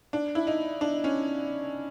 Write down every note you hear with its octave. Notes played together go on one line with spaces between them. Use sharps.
D4
E4
D#4
D4
C#4